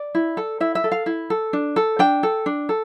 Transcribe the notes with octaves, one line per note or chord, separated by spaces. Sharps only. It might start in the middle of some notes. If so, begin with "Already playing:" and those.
Already playing: D5
E4
A4
E4 E5
E5
A4
F5
E4
A4
D4
A4
D4 G5
A4
D4
A4